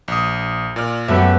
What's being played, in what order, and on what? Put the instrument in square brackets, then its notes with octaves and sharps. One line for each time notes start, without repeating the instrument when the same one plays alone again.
[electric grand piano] A#1 D#6
A#2 D5 F6
[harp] F#2 A3 B3 [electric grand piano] G4 E5